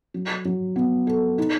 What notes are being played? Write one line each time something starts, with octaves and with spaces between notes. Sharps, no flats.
F#3
F#3
B3
A4
D#4